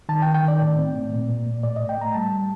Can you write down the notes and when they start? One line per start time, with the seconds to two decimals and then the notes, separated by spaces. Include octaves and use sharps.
0.09 D#3 A5
0.22 G5
0.27 D#3
0.34 G5
0.43 D#3
0.48 D5
0.61 A2
0.78 C4
0.94 A2
1.12 A#2
1.30 A#2
1.47 A#2
1.63 A2 D5
1.76 A2 D#5
1.89 G5
1.98 A3 A#5
2.14 G3 A5
2.32 G3